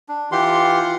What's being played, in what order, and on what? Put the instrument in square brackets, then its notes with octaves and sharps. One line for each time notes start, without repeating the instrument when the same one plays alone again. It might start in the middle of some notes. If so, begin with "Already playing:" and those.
[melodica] D4
[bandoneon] E3 G4 C6 [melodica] F4 F#5